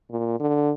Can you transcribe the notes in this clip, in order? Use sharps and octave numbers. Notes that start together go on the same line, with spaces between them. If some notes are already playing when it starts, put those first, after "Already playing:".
A#2
D3